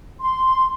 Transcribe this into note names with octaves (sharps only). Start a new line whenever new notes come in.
C6